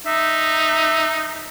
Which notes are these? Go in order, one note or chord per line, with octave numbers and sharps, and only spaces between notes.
D#4 E5